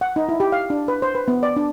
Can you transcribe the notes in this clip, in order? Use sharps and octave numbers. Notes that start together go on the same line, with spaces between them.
F#5
D#4
E4
G4
F5
D4
B4
C5
B4
B3
D5
D4